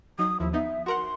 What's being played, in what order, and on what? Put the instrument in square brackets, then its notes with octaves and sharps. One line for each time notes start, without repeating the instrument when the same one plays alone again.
[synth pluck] F#3 D#4 [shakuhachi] D#6
[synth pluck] D#2 F3 [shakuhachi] E4
[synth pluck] B3 D#4 [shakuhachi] E5
[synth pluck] F#4 A#4 F#5 [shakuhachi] C6